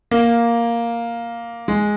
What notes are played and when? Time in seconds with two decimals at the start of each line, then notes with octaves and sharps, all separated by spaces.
0.11 A#3
1.68 G#3